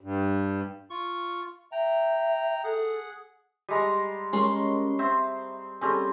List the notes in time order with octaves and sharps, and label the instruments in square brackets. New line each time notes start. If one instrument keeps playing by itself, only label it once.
[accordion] G2
[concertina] F4 C#6
[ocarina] E5 [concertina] G5 A#5
[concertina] G#4 F#5 [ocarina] A4
[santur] G3 G#3 A#5
[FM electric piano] G#3 C#4 A#4 [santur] C6 C#6
[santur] C4 [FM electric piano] C5 E5
[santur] G3 C4 C#4 [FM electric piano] G#4 A4 D#5